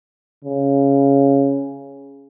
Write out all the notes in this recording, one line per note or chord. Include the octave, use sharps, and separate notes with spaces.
C#3